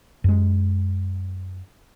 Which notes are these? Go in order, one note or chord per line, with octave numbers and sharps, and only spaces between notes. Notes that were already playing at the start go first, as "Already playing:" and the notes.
F#2 G#3